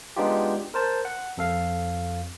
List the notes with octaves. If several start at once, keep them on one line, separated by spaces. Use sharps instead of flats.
G#3 B3 D4 D#4 F4 G4
A#4 C5 A5
F#5
F2 A4 F5